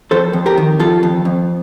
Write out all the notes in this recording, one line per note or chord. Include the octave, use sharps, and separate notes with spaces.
F2 A4 C5
F2
G4 A#4
D#3
F2 F4 A4
F2
F2